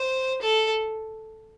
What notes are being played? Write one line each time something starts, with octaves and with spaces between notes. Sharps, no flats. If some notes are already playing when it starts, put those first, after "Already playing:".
Already playing: C5
A4